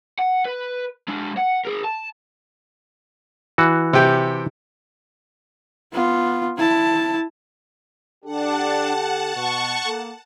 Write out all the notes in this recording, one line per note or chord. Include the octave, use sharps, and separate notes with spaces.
F#5
B4
G#3 D4
F#5
G#4 A#4
A5
E3 F#4
C3 G4 G5
B3 F4
E4 A5
D3 D4 G4 A4 F#5 A5
B2 C#6
A#3 A4